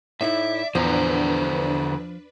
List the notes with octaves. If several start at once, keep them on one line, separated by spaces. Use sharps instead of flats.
A2 D#4 E4 D5 E5 D6
E2 D3 F3 D4 B4 C5 A#5